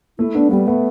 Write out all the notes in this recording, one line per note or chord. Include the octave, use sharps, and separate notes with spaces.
A3 E4
B3 D4
G3 B3
A3 B3